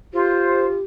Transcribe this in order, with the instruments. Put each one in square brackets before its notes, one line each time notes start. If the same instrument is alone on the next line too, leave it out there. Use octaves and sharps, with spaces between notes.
[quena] F4 [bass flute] G4 [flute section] C5